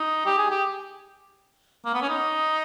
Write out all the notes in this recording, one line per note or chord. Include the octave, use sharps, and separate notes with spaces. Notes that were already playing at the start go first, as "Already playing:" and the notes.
Already playing: D#4
G4
G#4
G4
A#3
B3
C#4
D#4